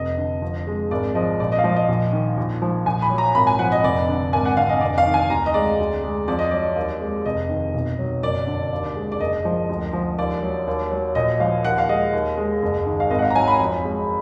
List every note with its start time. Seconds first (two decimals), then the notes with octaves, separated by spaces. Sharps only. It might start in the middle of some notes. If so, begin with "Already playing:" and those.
Already playing: F1 D#5
0.17 D3
0.42 F2
0.67 G#3
0.91 G#1 D5
1.15 F3 D#5
1.40 A#1 D5
1.52 D#5
1.59 F5
1.64 F3 D#5
1.76 D#5
1.89 A#1
2.13 D#3
2.37 A#1
2.62 F3
2.86 A#1 G#5
3.02 B5
3.10 F#3
3.18 A#5
3.35 G#1 B5
3.47 G#5
3.59 F3 F#5
3.72 D#5
3.83 F1 D5
4.08 D3
4.33 G#1 G#5
4.45 F#5
4.56 D3 F5
4.69 D#5
4.81 F1 D5
4.98 F5
5.06 D#3
5.14 G#5
5.30 D2 A#5
5.46 D#5
5.54 G#3 D5
5.79 D2
6.04 G#3
6.28 F2 D5
6.39 D#5
6.51 F#3 D5
6.76 D#2
7.01 G#3
7.25 F1 D#5
7.49 D#3
7.74 B1
7.98 F#3
8.23 F#1 D5
8.47 D3
8.72 D#2
8.95 G#3
9.12 D5
9.20 F#1 D#5
9.45 F3
9.69 D2
9.93 F3
10.18 D#2 D5
10.42 F#3
10.67 D#2
10.91 F#3
11.15 A#1 D#5
11.40 F3 F5
11.64 D#2 F#5
11.78 F5
11.89 G#3 D#5
12.13 D#2
12.37 G#3
12.62 F#1
12.86 D#3
13.00 F5
13.10 G#1 D#5
13.19 F#5
13.22 F5
13.30 A#5
13.35 F#3 G#5
13.48 B5
13.60 F2
13.84 G#3